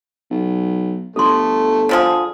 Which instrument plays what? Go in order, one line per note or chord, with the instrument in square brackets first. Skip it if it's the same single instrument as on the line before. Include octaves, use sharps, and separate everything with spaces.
[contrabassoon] B1
[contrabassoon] G1 [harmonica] A3 [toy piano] A4 C6
[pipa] D3 F3 G#4